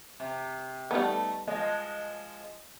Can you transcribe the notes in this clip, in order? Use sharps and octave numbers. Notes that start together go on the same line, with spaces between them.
C3
G3 A3 B3 D#4
F3 G#3 D#5